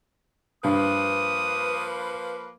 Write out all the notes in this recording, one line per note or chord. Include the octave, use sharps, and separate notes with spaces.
G2 F3 A#3 B4 D#6